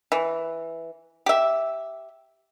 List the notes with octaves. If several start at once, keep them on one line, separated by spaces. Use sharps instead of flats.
E3
G4 E5